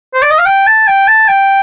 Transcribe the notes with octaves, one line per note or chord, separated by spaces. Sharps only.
C5
D5
D#5
F5
G5
A5
G5
A5
G5